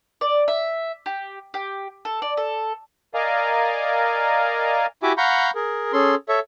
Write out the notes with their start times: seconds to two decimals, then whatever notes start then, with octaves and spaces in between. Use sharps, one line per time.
0.21 D5
0.48 E5
1.06 G4
1.54 G4
2.05 A4
2.22 D5
2.37 A4
3.14 A#4 D5 D#5 F5 G#5 A#5
5.03 E4 F#4 G4 E5 G#5 D6
5.18 F5 F#5 A#5 B5 C#6 G6
5.55 G#4 A#4
5.93 C#4 G#4 A4 C6
6.29 A4 C#5 E5